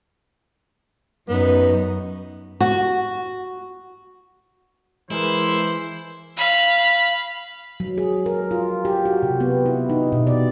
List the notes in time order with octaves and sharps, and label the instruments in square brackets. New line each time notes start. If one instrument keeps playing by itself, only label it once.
[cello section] F#2 D#4 [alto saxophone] B3
[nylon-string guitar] F#4
[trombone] E3 [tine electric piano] G#3 G#4 A#4 [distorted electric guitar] E4 [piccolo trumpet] C5
[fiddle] F5 B5
[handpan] F#3
G#4
A#4
F4
G4
F#4
C3
B3
E4
D#4
B2
D5